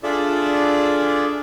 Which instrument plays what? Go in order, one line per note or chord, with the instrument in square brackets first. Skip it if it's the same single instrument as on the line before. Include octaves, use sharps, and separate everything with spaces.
[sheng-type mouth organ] D4 F4 G#4 A4 D5 E5